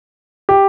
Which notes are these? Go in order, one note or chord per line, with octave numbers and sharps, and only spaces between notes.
G4